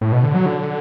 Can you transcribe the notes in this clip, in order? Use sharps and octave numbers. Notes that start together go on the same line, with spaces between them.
A2
B2
D3
F#3
D3